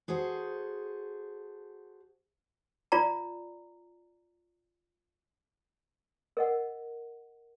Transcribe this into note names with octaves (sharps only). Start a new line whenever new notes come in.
F#4 G#4 A4 C5
F4 D5 A#5
A#4 D#5 F#5